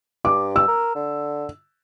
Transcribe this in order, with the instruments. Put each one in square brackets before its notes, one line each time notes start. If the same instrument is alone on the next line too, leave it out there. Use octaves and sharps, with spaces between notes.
[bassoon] G2 [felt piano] D6
[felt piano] E6
[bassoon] A#4
D3